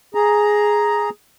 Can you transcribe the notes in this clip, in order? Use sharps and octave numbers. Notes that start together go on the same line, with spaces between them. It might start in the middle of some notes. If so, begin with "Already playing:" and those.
G#4 A#5